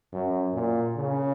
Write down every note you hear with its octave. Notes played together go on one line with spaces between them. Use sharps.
F#2
A#2
C#3